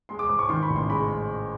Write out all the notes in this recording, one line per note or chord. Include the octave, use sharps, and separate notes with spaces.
G#3 C6
D6
G#2 D6
C#6
D#3 C6
B5
A1
C6
G#3 B5